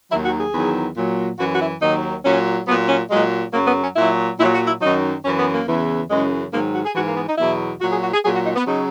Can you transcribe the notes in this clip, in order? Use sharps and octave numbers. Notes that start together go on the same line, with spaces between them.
D#2 D#3 F#3 E4
F#4
G#4
E2 D#3 F#3
A#2 F#3
F#2 E3 F#4
F#4
E4
D#2 D#3 F#3 D#4
A#2 F#3 C#4
A#2 F#3 B3
C#4
A#2 F#3 G#3
F#2 C#3 F#3 A#3
B3
C#4
A#2 F#3 E4
A#2 F#3 E4
F#4
E4
F#2 D#3 F#3 D#4
F#2 E3 C#4
B3
A#3
E2 C#3 E3
F#2 C#3 E3 G#3
G#2 D#3 F#3 A#3
F#4
G#4
G#2 E3 F#4
A#3
B3
D#4
E2 B2 F#3 E4
A#2 F#3 F#4
G#4
F#4
G#4
A#2 F#3 G#4
F#4
D#4
B3
C#3 F#3 D#4